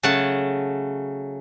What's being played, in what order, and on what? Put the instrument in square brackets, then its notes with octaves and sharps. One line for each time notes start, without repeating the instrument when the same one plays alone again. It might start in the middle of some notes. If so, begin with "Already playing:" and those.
[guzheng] C#3 F#3 A3 F#5 A5